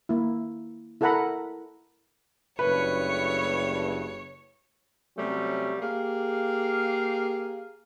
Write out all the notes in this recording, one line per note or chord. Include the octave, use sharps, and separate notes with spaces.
A#3 E4
E4 A4 A#4 F#5 A#5 B5
F#1 G2 A3 B4 C#5
C3 F#3 G3 A3 C#4
A#3 G4 G#4 F5